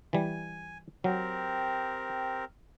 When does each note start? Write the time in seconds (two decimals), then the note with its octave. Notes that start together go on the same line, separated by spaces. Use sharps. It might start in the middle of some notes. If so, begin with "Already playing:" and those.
0.13 E3 G3 G#5
1.04 F#3 C4 G4 A#4